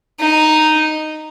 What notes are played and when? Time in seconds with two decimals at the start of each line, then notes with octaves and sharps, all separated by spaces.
0.20 D#4